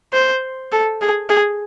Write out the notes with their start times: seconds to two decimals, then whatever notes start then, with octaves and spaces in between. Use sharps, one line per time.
0.13 C5
0.72 A4
1.01 G#4
1.30 G#4